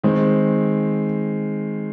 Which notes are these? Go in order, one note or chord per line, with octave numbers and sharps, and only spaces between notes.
D#3 G#3 C4